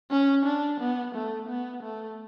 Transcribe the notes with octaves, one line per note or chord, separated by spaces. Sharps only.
C#4
D4
B3
A3
B3
A3